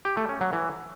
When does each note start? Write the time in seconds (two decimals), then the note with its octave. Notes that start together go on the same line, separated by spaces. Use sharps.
0.05 G4
0.17 A3
0.29 C#4
0.41 F#3
0.53 E3